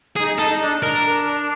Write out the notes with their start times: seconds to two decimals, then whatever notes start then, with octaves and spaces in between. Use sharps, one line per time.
0.16 D#4 G#4
0.38 D#4 A4
0.52 D#4
0.60 D4
0.82 D4 A#4